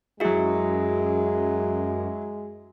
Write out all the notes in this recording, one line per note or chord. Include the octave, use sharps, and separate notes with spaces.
F#2 F#3 G#3 E4 F#4 G#4